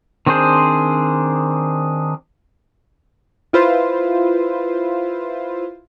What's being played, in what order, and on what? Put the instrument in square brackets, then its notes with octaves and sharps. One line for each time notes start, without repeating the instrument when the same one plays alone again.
[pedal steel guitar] D#3 C4 D4 G#4 C5
[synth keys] E4 F4 B4 C5